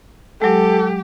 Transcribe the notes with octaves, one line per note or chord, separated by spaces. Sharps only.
F#3 G#3 G4 A4